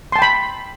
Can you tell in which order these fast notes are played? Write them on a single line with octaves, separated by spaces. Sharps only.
C6 A5 G5 B5